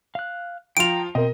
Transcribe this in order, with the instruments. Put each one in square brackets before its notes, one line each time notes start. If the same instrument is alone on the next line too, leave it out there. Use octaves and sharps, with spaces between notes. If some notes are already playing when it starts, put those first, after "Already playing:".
[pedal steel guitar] F5 F#6
[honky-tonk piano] F3 F4 [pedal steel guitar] G5 A#5 [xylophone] D7 F7
[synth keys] B2 A#4 [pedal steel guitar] C4 [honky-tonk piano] D#5